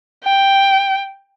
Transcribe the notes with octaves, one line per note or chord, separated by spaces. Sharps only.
G5